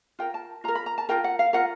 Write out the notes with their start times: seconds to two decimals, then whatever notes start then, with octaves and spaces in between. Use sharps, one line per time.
0.19 F4 A#4 G5
0.34 A5
0.64 F4 A#5
0.68 A#4
0.75 B5
0.86 A#5
0.98 A5
1.09 F4 A#4 G5
1.24 F#5
1.39 F5
1.53 F4 A#4 F#5